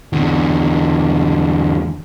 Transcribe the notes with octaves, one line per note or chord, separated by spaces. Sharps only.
E2 D3